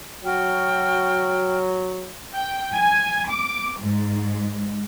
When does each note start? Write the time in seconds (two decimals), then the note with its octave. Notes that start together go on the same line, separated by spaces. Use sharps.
0.24 F#3 F#4 G5 F6
2.34 G5
2.75 G#5
3.30 D6
3.81 G#2